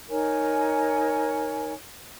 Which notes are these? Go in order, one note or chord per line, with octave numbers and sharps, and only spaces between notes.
D#4 A#4 C#5 G#5